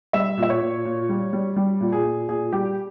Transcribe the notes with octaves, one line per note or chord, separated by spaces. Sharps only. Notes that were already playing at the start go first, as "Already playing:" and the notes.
G3 E5
A#2
E5
C#5
A#2
A#2
G3
G3
G3
A#2
G#4
A#2
A#2 G#4
G3 G4